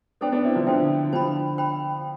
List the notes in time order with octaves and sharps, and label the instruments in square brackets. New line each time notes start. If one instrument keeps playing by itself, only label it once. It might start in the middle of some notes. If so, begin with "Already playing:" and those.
[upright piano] B3 D4 [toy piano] A4 C5 G5
[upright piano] B3 D4
C4 E4
D3 F3
[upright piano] D3 F3 [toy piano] A4 C5 G5
[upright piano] D3 F3 [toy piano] C5 G5 B5
[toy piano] C5 G5 B5